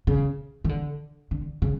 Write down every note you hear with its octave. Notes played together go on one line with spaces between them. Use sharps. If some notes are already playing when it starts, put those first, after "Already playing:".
C#3
D#3
D3
D3
C#3